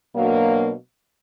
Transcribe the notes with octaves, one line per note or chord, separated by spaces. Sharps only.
B2 F#3 A#3 D4